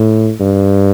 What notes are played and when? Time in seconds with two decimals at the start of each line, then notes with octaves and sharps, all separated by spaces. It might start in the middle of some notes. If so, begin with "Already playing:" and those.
Already playing: A2
0.40 G2